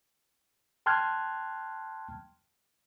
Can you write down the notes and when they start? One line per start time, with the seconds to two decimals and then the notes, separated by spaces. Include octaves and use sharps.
0.86 G5 A5 C6 F6 F#6 G#6